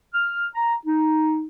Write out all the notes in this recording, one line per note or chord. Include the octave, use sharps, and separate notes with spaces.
F6
A#5
D#4